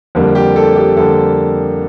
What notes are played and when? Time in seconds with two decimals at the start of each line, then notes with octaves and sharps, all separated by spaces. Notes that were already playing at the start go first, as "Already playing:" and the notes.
0.15 F2 D3 G3 A#3
0.35 G4
0.56 A4
0.76 G4
0.96 F2 D3 G3 A#3 A4